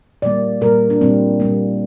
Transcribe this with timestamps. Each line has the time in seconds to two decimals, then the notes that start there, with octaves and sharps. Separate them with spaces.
0.22 A#2 G3 A#3 D5
0.61 A#2 G3 A#3 A#4
0.90 D4
1.01 A#2 G3 A#3 C4
1.40 A#2 G3 A#3